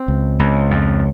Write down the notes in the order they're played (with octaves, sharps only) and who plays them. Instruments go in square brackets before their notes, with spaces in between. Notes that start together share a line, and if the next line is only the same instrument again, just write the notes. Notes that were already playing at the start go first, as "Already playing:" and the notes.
Already playing: [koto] C4
[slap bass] C#2
C#2
F2